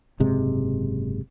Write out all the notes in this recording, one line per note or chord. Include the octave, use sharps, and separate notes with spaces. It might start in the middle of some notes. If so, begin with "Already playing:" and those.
F#1 G#2 C3 G#3